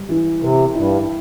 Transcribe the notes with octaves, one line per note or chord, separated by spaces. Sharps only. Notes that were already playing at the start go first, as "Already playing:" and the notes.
Already playing: G3
E3
C3 A#4
G2 E4